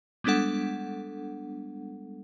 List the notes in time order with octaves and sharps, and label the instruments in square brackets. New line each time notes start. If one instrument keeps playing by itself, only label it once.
[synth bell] G3 G#3 B3 D4 A4 F#5